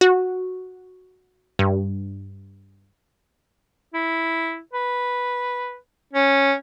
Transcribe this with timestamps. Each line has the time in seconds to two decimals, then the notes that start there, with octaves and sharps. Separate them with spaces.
0.01 F#4
1.59 G2
3.94 E4
4.73 B4
6.13 C#4